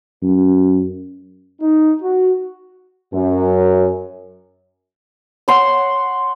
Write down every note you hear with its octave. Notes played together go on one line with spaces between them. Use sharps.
F#2
D#4
F#4
F#2
C#5 F#5 C6